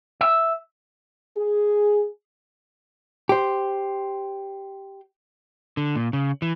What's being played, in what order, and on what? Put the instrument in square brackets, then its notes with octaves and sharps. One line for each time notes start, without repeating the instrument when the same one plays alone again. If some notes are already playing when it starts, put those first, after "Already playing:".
[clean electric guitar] E5
[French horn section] G#4
[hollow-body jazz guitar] G4 C5
[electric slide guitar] D3
A#2
C#3
E3